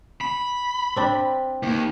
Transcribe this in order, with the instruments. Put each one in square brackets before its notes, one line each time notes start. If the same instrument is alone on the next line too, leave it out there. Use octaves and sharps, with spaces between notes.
[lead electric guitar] B5
[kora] C4 D4
[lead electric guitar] D#2